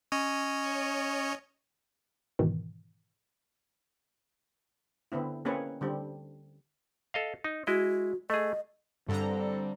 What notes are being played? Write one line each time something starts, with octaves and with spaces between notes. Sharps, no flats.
C#4 C#5 D#5
G#2 B2 D#3 E3
D3 B3 C4 E4
A#3 C4 C#4 G#4 B4 C#5
D3 G3 C4
A4 D#5 F5
D#4
G#3 E4 F#4 D#5
A3 G#4 D#5
G2 D3 G3 C4 D4 A4 A#5